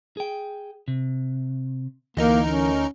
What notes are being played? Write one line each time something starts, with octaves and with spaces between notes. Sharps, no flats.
G#4 G5
C3
D2 E3 A#3 D#4 A#4
C#4